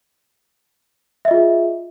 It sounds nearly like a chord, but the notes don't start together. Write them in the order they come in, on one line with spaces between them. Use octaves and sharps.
E5 D#5 F4 G#4